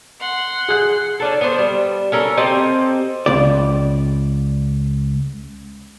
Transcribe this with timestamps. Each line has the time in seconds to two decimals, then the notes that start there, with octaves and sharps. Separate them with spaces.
0.20 F#5 C6
0.68 G#4 F#6
1.20 C#4 D4 A4
1.41 B3 D4 B4 C5
1.58 G3
2.12 C#4 A4 A#4
2.38 C4 G4 D#5 A5
3.26 C#2 D5